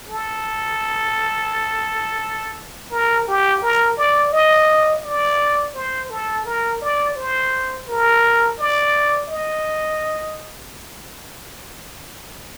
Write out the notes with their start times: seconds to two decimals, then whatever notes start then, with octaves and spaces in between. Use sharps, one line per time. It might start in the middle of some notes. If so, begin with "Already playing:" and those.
0.08 A4
2.91 A#4
3.27 G4
3.62 A#4
3.97 D5
4.33 D#5
5.04 D5
5.75 C5
6.10 A4
6.46 A#4
6.82 D5
7.16 C5
7.88 A#4
8.59 D5
9.29 D#5